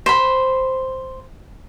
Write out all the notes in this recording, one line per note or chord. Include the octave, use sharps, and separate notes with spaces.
C5 B5